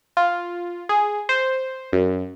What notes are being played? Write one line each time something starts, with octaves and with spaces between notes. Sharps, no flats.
F4
G#4
C5
F#2